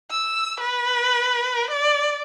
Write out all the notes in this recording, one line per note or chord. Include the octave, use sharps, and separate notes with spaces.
E6
B4
D5